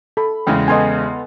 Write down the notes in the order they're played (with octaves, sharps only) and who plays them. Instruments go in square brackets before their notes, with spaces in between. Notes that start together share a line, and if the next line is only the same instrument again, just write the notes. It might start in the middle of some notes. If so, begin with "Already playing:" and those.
[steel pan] A4 [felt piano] B5
[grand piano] E2 C#3 G#3 [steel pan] G5
[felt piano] B3 A4 C6 [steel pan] D#5 G#5